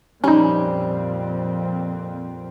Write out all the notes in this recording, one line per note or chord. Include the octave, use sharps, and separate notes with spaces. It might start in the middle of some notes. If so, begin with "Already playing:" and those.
F2 A#2 G3 C4 C#4 D#4